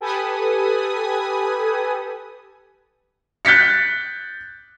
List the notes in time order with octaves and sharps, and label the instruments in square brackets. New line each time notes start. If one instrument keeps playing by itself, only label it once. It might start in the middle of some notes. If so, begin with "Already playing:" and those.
[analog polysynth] G4 A4 B4 G#5 B5 D#6
[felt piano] F#6 G6 A6 B6 C#7